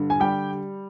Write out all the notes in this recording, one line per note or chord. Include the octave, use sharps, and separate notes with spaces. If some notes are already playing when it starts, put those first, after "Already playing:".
Already playing: G2 D3
G#5
G3 G4 G5